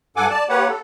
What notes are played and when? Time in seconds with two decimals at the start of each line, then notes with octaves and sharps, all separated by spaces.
0.16 G2 A4 F#5 G#5 D6
0.30 D5 A5
0.49 A#3 G4 B4 C#5 F#5
0.69 A4